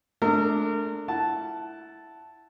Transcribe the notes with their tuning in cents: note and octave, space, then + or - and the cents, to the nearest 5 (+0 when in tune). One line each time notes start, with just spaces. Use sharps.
A3 -30 D4 +0 A#4 -30
E4 +0 F#5 +15 A5 -5